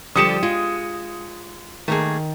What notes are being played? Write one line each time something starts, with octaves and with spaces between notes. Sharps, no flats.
D3 F3 G3 G4 A4 D#6 C#7 E7
G#3 F4
D#3 A3 A#3 G#4